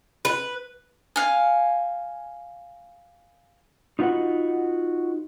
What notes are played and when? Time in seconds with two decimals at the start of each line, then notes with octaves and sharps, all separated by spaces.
0.25 B4
1.16 F5 G#5
3.99 D#4 F4 F#4 B4 D#5 F#5